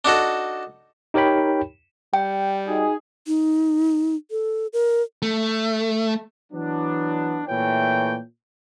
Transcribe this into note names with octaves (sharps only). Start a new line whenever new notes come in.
D4 D#4 F#4 A4
D#4 G4 A#4 C#5 G5 B5
G3 G5
D#4 F#4 G#4
D#4
A4
A#4
A3
E3 F#3 B3 D4
A#2 E3 A3 C#5 G5